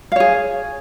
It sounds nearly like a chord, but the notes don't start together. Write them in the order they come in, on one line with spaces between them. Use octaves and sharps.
F5 C#5 G#4